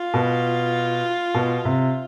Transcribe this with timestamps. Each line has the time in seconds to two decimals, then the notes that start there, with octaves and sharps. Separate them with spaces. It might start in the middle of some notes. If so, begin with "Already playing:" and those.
Already playing: F4
0.14 B2
1.34 B2
1.65 C3